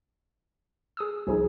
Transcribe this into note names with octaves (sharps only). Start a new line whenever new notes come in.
G#4 D#6 E6
C2 F3 D#4 G#4